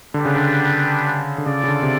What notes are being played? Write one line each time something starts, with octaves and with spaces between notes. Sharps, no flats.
D3 G3 B3 D4 G4
C#3
D3
D3
C#3 F4 A4 D5
C#3
D3
C3